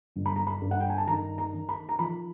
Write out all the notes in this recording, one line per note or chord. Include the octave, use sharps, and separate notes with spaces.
G1
B5
A#5
B5
G2
F#5
G5
G#5
A5
D#3 A#5
A#5
D#3
B5
A#5
F3 B5